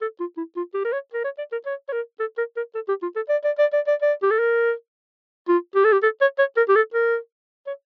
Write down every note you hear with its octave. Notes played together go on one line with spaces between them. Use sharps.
A4
F4
E4
F4
G4
A#4
C#5
A#4
C#5
D5
A#4
C#5
C#5
A#4
A4
A#4
A#4
A4
G4
F4
A4
D5
D5
D5
D5
D5
D5
G4
A4
A#4
F4
G4
A4
G4
A4
C#5
C#5
A#4
G4
A4
A#4
C#5